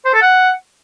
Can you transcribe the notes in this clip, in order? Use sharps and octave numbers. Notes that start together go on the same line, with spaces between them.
C5
A4
F#5